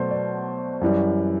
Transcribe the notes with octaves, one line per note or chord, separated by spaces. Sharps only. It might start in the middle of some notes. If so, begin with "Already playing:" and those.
Already playing: B2 F#3 A3 C5 D5
D5
F#2 E3 G3